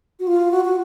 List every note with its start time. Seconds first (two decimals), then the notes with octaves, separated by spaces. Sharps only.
0.20 F#4
0.27 F4
0.51 F#4
0.65 F#4